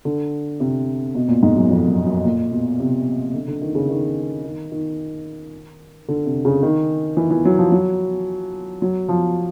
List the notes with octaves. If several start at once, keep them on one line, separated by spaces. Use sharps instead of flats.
D3
C3
B2
A#2
G#2
F#2
F2
F#2
F#2
A#2
B2
C3
D3
D3
D#3
C#3
D#3
D#3
D#3
D3
C3
C#3
D#3
E3
E3
F#3
F3
F#3
F#3
F3